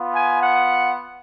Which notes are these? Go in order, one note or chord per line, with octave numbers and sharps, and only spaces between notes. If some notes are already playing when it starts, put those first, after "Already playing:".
Already playing: B3 F4
G#5
F#5